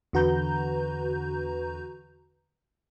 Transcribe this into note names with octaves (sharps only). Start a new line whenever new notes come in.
E2 D3 F#4 B4 A#5 G6